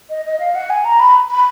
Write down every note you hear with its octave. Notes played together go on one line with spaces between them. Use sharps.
D#5
D#5
F5
F#5
G#5
A#5
B5
B5